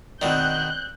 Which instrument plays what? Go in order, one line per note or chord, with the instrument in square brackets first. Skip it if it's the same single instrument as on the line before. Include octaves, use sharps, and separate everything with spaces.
[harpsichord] B2 D#3 [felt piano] C4 D5 [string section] F#6 G6